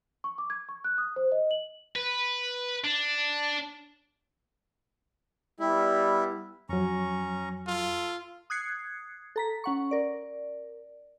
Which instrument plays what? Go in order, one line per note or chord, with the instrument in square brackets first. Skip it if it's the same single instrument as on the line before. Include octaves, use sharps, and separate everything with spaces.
[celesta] C#6
D6
G#6
C#6
F#6
D#6
C5
D#5
F#7
[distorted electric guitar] B4
D4
[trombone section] G3 B3 [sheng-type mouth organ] E4
[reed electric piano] F2 F#3 [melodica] C#4 A#5 C#6
[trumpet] F4 [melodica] A4
[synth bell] D#6 F#6 G#6 C7 C#7
A4 A#5 B6
C#4 F#5 C#6
A#4 D5